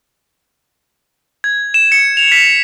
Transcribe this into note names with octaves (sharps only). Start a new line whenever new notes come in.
G#6
E7
C#7
F7
B6